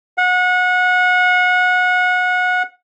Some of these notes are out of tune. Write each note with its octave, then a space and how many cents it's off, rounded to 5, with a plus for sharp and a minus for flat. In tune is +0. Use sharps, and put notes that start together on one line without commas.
F#5 -25